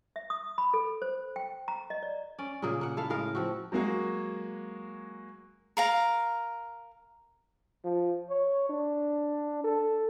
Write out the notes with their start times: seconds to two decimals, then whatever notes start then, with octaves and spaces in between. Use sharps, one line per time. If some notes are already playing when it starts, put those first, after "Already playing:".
0.16 E5
0.30 D#6
0.58 B5
0.74 A4
1.02 C5
1.36 G5
1.68 A#5
1.90 D#5
2.03 D5
2.39 C#4 D5
2.62 A#2 C#3 A#3 G#4
2.81 A#3 F#5
2.97 E4 A4 F5
3.10 A2 G#3 A#4 F5
3.35 F3 C4 F#4
3.72 F#3 G#3 A#3 F#4 G#4
5.77 A#4 F5 A#5
7.85 F3
8.29 C#5
8.70 D4
9.64 A4